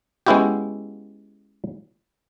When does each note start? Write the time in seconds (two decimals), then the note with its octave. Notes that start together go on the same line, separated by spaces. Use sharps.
0.27 G#3 B3 C#4 E4 F#4 G4